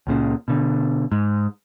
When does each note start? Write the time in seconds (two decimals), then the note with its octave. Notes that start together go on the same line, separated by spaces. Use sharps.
0.07 C#2 A#2 C#3
0.48 B2 D3
1.12 G#2